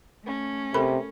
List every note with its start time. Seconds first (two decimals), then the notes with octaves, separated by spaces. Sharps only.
0.25 A3 C#4
0.74 C3 A4 A#4 B5